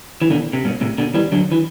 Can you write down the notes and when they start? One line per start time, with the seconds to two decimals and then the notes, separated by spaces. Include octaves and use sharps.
0.22 E3
0.30 B2 D3
0.53 C3
0.65 G2 B2
0.81 A2 C3
0.98 B2 D3
1.14 E3 G3
1.32 D3 F#3
1.52 E3